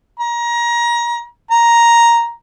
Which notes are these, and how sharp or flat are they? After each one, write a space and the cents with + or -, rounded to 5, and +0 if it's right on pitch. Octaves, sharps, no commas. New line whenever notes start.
A#5 +25
A#5 +5